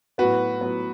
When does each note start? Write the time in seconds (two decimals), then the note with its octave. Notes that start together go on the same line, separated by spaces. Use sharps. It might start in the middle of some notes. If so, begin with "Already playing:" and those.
0.18 A2 F#3 B3 F#4 B4
0.61 A2 F#3 B3